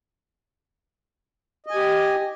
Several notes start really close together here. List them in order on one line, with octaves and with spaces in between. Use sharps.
D#5 G#5 G4